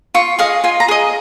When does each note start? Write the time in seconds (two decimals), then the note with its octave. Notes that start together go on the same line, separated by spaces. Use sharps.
0.14 F4 C#6
0.39 G#4 D#5 F5
0.64 F4 G#5
0.80 A#5
0.88 G#4 D#5